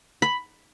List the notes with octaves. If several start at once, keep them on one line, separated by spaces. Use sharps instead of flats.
B5